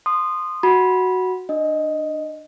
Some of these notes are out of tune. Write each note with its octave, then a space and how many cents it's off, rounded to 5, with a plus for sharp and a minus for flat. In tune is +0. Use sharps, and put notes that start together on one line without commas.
C6 +0 D#6 -20
F#4 +0 B5 -15
D4 +25 D#5 +0